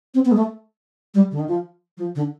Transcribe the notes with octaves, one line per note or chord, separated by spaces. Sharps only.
C4
B3
G#3
A3
G3
D3
D#3
F3
F3
D3